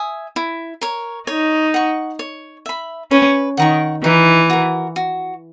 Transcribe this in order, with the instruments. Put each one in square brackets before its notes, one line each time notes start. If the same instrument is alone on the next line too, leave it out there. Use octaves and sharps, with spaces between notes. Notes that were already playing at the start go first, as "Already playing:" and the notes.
Already playing: [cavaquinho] E5 G#5 D#6
E4
A#4 C#5
[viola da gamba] D#4 [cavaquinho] C#5
[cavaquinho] F#5 C#6
C#5
E5 B5
[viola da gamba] C#4 [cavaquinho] B4
[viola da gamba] D#3 [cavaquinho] F#5 A#5 C#6
[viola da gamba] E3 [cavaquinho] D#4
[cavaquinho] F#4 A#4
F#4